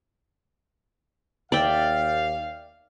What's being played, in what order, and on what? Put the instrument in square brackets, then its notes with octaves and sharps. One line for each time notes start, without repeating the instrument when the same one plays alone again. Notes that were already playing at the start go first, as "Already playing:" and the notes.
[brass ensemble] D#2 F5 [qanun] D5 E5 G5